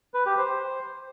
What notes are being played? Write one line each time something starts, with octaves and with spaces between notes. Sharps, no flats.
B4
G4
C5